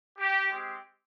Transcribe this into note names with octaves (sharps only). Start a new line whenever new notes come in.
G4
G#3 C4 G4